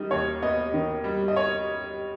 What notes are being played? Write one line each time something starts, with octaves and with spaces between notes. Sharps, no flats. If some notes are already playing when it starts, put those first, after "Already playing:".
Already playing: D#3 G3 D#5
D#2 C#5
B3 D#5
D#3
G3
D#5
C#5